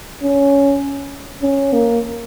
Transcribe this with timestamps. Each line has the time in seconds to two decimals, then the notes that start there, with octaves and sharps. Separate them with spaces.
0.23 C#4
1.43 C#4
1.73 A#3